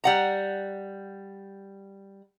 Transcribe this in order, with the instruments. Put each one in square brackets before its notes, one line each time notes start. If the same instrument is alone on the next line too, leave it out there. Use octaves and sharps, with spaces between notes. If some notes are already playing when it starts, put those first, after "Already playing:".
[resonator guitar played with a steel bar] G3 F#5 A#5